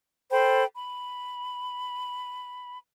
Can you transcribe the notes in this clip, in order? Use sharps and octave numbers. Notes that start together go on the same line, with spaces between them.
A4 C5 G5 B5
B5